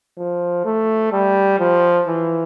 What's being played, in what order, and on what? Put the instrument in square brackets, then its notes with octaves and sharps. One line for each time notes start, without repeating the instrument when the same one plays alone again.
[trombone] F3
A3
G3
F3
E3